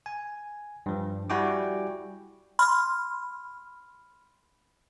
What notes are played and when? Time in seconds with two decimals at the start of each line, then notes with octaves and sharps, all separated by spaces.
0.06 G#5
0.86 G2 F3
1.30 G3 E4 F#4 G5 G#5 D6
2.59 B5 C6 F6